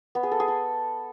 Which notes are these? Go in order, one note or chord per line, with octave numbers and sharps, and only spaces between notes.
B3
G#4
A4
G#4
A4